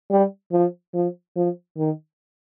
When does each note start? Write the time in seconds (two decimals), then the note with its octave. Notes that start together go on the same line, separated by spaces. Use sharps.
0.11 G3
0.52 F3
0.94 F3
1.36 F3
1.77 D#3